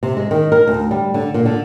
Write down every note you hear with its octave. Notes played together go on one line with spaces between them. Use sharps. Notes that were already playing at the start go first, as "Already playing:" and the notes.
C3
G#3
D#3
A#4
D2
G3
D3
A#2
D3